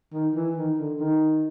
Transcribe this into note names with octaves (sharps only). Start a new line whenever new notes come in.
D#3
E3
D#3
D3
D#3